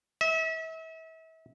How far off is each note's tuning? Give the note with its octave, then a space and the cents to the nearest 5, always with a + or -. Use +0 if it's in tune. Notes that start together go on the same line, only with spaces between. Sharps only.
E5 -35